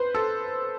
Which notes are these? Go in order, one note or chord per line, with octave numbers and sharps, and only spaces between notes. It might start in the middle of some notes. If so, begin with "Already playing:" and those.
Already playing: B4 C5
A4